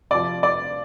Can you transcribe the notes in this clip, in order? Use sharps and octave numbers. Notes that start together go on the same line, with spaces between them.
C3 F3 D5
D5